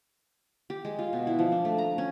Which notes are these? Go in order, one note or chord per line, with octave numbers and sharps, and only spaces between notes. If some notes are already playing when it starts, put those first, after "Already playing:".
G4
G#3
F4
B2
E4
F3
D4
A3
A#5
C#4